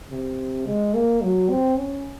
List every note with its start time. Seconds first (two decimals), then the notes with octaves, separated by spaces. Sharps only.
0.11 C3
0.66 G#3
0.94 A#3
1.22 F#3
1.50 C4
1.78 C#4